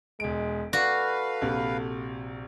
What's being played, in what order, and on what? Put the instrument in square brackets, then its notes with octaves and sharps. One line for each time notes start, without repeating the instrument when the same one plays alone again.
[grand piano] E1 D7 [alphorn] G#3
[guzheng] F#4 [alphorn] A4 [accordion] B4 F5 [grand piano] D5
[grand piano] A#1 C3